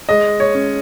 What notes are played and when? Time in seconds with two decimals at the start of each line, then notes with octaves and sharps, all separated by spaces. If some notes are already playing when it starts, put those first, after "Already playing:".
0.09 G#3 D#5
0.40 C#5
0.55 C#4